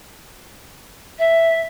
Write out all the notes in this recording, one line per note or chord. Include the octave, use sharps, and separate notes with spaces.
E5